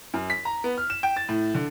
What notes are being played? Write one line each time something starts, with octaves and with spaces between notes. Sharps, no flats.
F#2
B6
A#5
B3
F6
E7
G5
A6
A2
D3